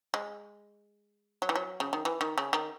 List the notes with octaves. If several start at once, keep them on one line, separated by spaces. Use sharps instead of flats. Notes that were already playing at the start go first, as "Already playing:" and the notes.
G#3
F#3
E3
F#3
C#3
D#3
E3
D#3
C#3
D#3